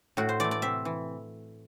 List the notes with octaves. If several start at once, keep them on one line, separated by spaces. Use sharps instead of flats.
A2 F#4
C5
E3 A3 D5
D5
C3 E5
E3